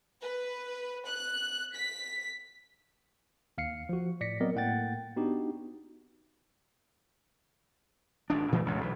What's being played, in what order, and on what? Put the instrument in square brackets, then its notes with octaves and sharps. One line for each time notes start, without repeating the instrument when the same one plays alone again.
[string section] B4
F#6
B6
[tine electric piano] D#2 F5 C7 C#7
F3 F#4
A2 D5 A#6 B6 C#7
F#3 B3 C4 A#4 D5 D#5
A2 A#3 F#5 G5 A6
B3 D4 D#4 F#4 G4
[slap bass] G#1 G#2 D4
A#2 E3 F#3 A3
G#1 C#2 F#2
B1 E3